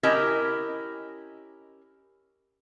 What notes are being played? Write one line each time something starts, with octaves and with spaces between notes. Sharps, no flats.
C#4 E4 G4 A#4 D#5